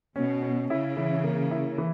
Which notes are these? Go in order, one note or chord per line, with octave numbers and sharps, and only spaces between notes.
B2 C#4
C#4
C#3 E4
E3
A#3
E4
E3